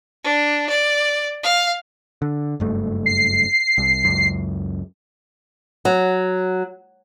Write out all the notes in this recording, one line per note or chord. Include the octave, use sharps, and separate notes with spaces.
D4
D5
F5
D3
F#1 G2 A3
C7
C2
C#2 F#2
F#3